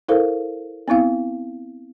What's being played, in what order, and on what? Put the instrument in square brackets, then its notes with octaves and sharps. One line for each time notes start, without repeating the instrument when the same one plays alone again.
[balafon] E4 A4 A#4 C5 F5
B3 C4 E4 F5